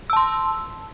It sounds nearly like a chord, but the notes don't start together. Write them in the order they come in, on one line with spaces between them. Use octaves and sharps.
E6 A5 C6